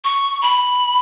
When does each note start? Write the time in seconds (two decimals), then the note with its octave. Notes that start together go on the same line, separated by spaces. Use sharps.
0.04 C#6
0.42 B5